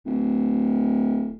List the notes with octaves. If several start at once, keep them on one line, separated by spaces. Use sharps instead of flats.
D1